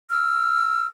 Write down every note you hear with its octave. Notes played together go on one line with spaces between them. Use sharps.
E6 F6